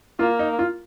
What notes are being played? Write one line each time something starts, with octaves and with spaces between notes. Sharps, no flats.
A#3 F4
D#4
F4